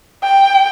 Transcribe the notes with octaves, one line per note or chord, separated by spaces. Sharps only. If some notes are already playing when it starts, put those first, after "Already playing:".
G5